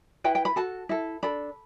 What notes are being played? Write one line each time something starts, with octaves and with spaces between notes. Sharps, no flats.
E4 B4 G5
G5
B5
F#4 A4 A5
E4 A4
D4 A4 B5